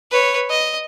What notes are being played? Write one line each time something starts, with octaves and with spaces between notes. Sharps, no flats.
B4 C#5
D#5